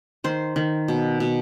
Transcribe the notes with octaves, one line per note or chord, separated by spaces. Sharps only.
D#3 C5
D#3
B2
B2